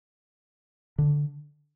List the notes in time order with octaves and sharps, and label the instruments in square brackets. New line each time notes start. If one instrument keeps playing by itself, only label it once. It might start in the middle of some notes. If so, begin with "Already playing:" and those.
[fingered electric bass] D3